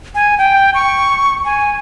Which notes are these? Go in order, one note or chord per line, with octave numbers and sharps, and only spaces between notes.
G#5
G5
C#6
G#5